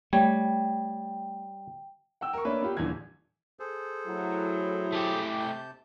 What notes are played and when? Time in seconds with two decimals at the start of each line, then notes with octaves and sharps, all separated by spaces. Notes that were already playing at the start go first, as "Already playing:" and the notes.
0.13 G3 A3 C#5 G5
2.21 F#5 G5 E6
2.33 A#4 C#6
2.45 A#3 D4 B4 C#5 E5
2.61 B3 D#4 F4 G4
2.77 D#1 E2 D3 E3 G#6
3.60 G#4 A4 C5
4.07 A2 F#3 E4
4.92 A3 G4
5.40 C3 A5 G6